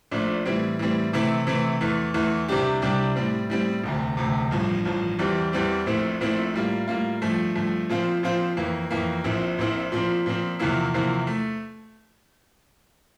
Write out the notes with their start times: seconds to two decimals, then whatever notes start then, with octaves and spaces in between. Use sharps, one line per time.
0.11 A#1 A#2 A3 D4
0.45 A2 E3 G3 C4
0.79 A2 E3 G3 C4
1.13 C3 E3 A3 C4 E4
1.47 C3 E3 A3 C4 E4
1.81 E2 E3 A3
2.14 E2 E3 A3
2.48 C2 C3 G3 D4 G4
2.82 C2 C3 G3 D4 G4
3.15 A2 G3 C4
3.50 A2 G3 C4
3.84 E1 D2 C3
4.17 E1 D2 C3
4.51 A1 G2 F3
4.85 A1 G2 F3
5.18 E2 E3 G3 C4 G4
5.52 E2 E3 G3 C4 G4
5.86 A#1 A#2 A3 C4 E4
6.21 A#1 A#2 A3 C4 E4
6.54 A2 G3 A#3 F4
6.88 A2 G3 A#3 F4
7.22 G2 F3 A3
7.55 G2 F3 A3
7.89 A#2 F3 C4 F4 C5
8.23 A#2 F3 C4 F4 C5
8.57 F2 E3 A#3
8.91 F2 E3 A#3
9.24 A#1 A#2 F3 C4 E4
9.58 A#1 A#2 F3 C4 E4
9.92 A#2 F3 C4
10.26 A#2 F3 C4
10.59 E2 C3 F3 A#3 E4
10.94 E2 C3 F3 A#3 E4
11.27 A3